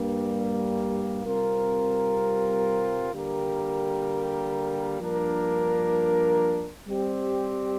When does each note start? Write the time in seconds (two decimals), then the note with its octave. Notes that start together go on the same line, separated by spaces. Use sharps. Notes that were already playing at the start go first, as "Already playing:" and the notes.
Already playing: G2 G3 A#3
1.25 C3 G3 C4 F4 A#4
3.13 D3 G3 A#3 G4 A#4
5.00 G2 F3 A#3 D4 A#4
6.87 G3 C4 G4 D5